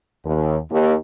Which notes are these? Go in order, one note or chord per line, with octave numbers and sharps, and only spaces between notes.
D#2
D#2